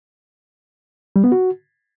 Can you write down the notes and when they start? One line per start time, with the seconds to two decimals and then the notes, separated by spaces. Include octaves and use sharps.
1.16 G3
1.24 B3
1.32 F#4